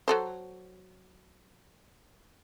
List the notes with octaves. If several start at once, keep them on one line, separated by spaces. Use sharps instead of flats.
F#3 A4 C5